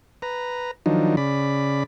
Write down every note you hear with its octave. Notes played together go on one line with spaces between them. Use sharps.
B4 A#5
D#3 F3 F#3 D4 D#4
C#3 D5 B5